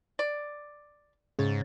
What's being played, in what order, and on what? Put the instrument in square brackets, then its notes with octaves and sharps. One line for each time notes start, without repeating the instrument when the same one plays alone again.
[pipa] D5
[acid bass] G#2 [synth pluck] C#3 C#5 A6